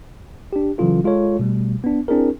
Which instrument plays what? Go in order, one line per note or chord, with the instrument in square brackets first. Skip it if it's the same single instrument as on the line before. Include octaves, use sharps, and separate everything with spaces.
[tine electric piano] D4 G4
C#3 E3 F#3 C#4 F4 A4
G#3 F4 A4 C#5
B2 G3 A3
B3 D4
C4 D4 E4 G#4 A#4